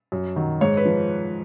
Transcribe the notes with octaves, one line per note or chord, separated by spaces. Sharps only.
F#2
D#3 F#3
G#2 C#5
B4
F3